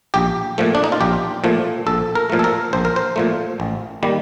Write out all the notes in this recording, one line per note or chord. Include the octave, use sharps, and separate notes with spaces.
A#1 G4
A#2 F3 A3
D4
D#4
F4
A#1 G4
A#2 F3 A3
A#1 A4
A#4
A#2 F3 A3
A4
A#4
A#1 C5
A#4
C5
A#2 F3 A3
A1
D#3 G3 A#3